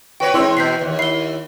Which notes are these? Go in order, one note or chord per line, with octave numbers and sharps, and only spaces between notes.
F#4 B4 C#5 G5
E3 G#3 C4 C#5 E5 C6 F#6
B2 G6 B6 C7
D#2
E4 C7 G7